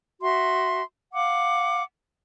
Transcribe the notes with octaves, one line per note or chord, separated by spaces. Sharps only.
F#4 E5 C6
F5 F#5 D6